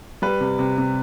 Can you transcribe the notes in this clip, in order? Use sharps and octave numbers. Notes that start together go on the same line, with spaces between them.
G3 B4
C3
C3
C3